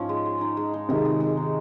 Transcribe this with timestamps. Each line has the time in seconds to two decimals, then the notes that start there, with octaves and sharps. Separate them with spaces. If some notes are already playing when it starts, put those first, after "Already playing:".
Already playing: G#2 F3 C#4
0.09 G#3
0.25 G#4
0.41 D#4
0.57 G#3
0.74 D#4
0.89 C3 D#3 G#3
1.05 G#3
1.20 G#3
1.37 D#4